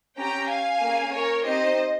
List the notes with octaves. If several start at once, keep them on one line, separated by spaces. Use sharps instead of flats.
C#4 G4 G5 A#5
F5 G#5
A#3 C#4 G#4
A#4 C#5
C4 D#4 G4 C5 D#5